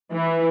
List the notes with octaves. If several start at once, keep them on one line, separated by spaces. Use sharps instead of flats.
E3